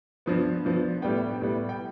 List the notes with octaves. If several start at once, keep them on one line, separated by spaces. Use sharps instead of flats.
G2 F3 B3
G2 F3 B3
A2 G3 B3 G5
A2 G3 B3
G5